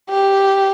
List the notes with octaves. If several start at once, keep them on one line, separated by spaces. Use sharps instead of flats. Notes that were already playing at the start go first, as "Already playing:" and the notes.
G4